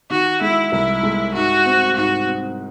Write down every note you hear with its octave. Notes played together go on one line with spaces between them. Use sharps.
D#3 F#4
G#3 E4
C2 E4
G#3
G#2 F#4
C4
G#2 F#4
C4